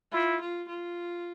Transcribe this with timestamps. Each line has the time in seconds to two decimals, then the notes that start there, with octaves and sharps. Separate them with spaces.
0.12 E4 F4
0.41 F4
0.69 F4